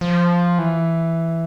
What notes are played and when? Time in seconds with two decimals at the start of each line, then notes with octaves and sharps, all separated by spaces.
0.01 F3
0.58 E3